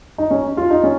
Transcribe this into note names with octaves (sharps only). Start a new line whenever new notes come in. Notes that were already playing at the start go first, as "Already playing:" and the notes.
D#4
C#4
F4
D#4
C#4